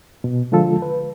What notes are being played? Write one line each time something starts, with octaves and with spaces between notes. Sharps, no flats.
B2
D3 F3 G#3 F4 A4
B4